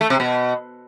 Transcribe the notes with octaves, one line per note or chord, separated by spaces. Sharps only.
A3
C3
B2